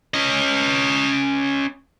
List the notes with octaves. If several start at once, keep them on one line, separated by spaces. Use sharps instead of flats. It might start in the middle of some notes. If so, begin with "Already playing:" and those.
C#4 D#5